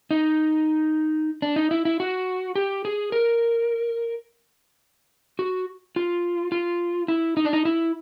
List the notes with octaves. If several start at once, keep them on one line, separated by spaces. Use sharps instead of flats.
D#4
D4
D#4
E4
E4
F#4
G4
G#4
A#4
F#4
F4
F4
E4
D#4
D4
D#4
E4